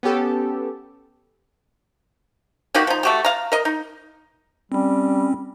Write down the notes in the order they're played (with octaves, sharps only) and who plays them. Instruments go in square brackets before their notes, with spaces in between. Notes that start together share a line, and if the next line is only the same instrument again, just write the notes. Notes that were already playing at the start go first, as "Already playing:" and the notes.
[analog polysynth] B3 C#4 G4 A4
[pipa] A#3 D#4 F#4 G4
F3 D#4
A3 F#4 G4
F5 A#5
A#4 D#5
D#4
[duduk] G3 [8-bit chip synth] C4 C#4